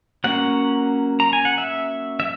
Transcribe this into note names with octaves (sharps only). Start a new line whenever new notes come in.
F#3 A#3 C#4 F#5
A#5
G#5
F#5
E5
E5